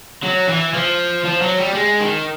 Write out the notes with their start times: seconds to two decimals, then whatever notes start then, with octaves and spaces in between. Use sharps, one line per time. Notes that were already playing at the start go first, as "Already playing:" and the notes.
0.23 F#3
0.48 E3
0.74 F3
1.24 F3
1.41 F#3
1.58 G3
1.75 G#3
2.00 D#3